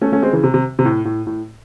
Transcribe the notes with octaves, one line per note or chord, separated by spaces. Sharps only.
A3 C#4
A3 C#4
G#3 C4
C#3 E3
C3
C3
C3
A2
A2
A2